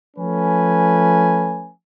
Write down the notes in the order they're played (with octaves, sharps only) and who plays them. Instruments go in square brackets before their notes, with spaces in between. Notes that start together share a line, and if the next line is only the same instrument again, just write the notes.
[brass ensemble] F3 A3 C#4 B4 G#5